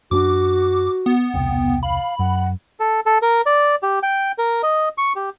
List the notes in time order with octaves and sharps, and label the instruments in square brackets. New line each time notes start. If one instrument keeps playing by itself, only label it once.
[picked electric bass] F#2 C#4 D4 [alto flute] F#4 [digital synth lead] D6
[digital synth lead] B3
[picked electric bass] E1 C2 [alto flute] G5
[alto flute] F5 [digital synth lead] B5
[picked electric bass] F#2 [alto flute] F#5
[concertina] A4
A4
A#4
D5
G4
G5
A#4
D#5
C#6
G4